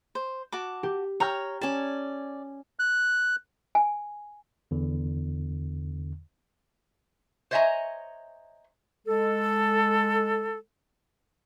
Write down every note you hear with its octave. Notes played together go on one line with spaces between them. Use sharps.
C5
F#4 A5 D6
G4
C#5 G5 A#5 F6
C#4 D5 A5
F#6
G#5
E2 D3
C5 C#5 D#5 E5 G#5 A#5
G#3 A4